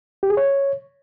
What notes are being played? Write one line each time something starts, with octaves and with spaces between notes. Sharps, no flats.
G4
G#4
C#5